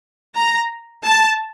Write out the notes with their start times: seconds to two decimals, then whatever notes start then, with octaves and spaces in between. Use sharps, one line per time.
0.36 A#5
1.05 A5